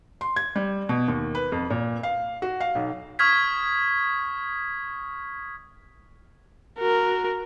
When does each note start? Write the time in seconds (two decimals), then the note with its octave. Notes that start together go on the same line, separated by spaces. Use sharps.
0.21 C6
0.36 G#6
0.56 G3
0.89 B2
1.08 D#2
1.35 B4
1.52 F2
1.70 A#2
2.03 F5
2.42 F#4
2.60 F5
2.75 B1
3.19 C#6 D#6 F6 G#6 B6
6.79 F#4 A#4